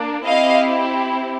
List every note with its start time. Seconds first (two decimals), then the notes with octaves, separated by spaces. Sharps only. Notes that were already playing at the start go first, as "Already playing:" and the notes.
Already playing: A#3 D4
0.25 C4 E4 G4 D#5 F5